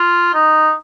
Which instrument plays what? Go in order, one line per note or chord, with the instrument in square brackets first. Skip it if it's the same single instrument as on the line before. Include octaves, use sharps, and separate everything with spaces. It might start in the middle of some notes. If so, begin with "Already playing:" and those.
Already playing: [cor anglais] F4
D#4